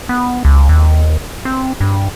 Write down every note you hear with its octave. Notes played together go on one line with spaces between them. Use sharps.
B3
C#2
D#2
C4
G2